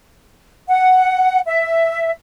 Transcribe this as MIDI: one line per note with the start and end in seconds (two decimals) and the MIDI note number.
0.68 1.39 78
1.46 2.11 76